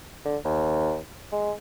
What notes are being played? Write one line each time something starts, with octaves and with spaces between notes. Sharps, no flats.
D3
D#2
G#3